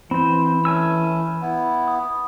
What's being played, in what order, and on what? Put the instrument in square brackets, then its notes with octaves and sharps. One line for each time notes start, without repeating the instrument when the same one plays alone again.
[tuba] E3 [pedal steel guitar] C4 C5 [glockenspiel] B5
[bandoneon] A3 C#4 [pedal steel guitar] G#5 E6
[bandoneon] B3 E4
[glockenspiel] D#6